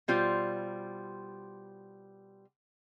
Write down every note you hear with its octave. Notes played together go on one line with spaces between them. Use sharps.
B2 G3 F4 C5